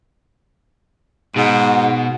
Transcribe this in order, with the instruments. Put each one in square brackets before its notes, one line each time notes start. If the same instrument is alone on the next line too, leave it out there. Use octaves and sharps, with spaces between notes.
[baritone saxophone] G#2 [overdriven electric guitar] B2